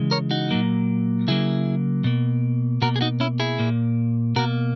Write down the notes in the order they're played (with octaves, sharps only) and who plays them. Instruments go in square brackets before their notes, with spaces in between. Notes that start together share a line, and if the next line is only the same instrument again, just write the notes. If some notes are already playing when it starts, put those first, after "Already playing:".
Already playing: [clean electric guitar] C#3 E3 G#3
A#4 C#5
D#4 F#4
A#2 F#3 A#3
C#3 F#3 A#3 E4 G#4
B2 A#3
B2 A#3 F#4 A#4
G#4
D#4 F#4
C#4 E4
E4 G#4
A#2 A#3
B2 A#3 F#4 A#4